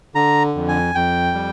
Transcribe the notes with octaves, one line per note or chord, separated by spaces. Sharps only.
D3 A#5
F2
G#5
F2 G5
G3